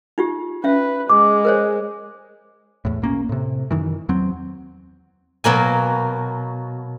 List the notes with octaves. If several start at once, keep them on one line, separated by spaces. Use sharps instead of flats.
D#4 F4 G4
C#4 B4 E5
G#3 D6
A#4 C5 C#5
E2 A2
B1 A#3 C#4
A2 C3
F#2 D#3 E3
E2 F#3 C4
B2 F#3 A#3 G#5